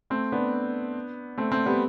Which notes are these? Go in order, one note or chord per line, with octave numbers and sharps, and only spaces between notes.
A3 C4
B3 D4
A3 C4
A3 C4
G3 B3